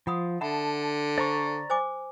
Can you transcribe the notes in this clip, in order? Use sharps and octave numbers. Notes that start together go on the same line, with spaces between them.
F3 F#5 B5 D#6
D3 E5 F#5 A5 B5
C5 D5 A#5 C#6
C5 G#5 D6